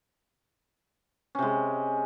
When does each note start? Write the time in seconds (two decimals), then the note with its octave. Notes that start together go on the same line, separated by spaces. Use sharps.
1.35 C#4
1.38 C3
1.42 G#3